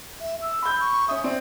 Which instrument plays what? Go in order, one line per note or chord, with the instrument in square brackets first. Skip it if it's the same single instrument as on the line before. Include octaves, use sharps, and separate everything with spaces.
[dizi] E5
E6
[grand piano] B5 G6
[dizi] C#6
[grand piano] C#4 D#6 [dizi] E5
[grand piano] C4 [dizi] D5